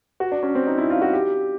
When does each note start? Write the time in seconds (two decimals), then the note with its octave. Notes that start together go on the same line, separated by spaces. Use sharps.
0.20 F#4
0.32 D4
0.43 C#4
0.55 C4
0.67 D#4
0.78 E4
0.90 F4
1.02 F#4
1.13 G4